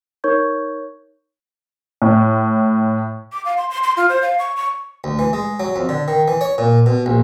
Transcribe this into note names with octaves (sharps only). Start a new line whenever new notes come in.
D#4 A#4 C#5 C#6 G6 G#6
A2
D6
F5
C6
C6
C6
F4
C5
F5
C#6
C#6
D2
E3
G#3
F#3
F2
D3
D#3
E3
C#5
A#2
B2
A#1